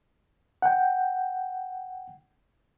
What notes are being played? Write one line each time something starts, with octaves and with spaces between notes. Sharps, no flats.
F#5 G5